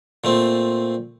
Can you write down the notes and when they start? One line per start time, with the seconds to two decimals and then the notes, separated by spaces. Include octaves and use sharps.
0.24 A#2 A3 C4